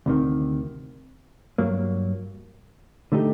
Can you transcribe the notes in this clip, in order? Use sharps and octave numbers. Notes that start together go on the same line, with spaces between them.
D2 C3 D#3
G2 F#3 A#3
D3 A3 D#4 G4